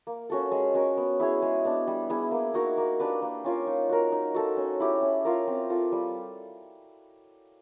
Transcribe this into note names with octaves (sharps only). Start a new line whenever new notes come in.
A#3
C#4 F#4 A4
G#3
C#4 F#4 A#4
B3
E4 G#4 C#5
G#3
B3 D4
G3
B3 E4 G#4
A#3
D#4 F#4 A#4
A#3
D4 G4 B4
A#3
C#4 F4 A#4
D#4
F#4 A#4
D#4
F#4 A4 C5
C#4
E4 G4
C#4
F4 A#4
C4
F4 A4
G3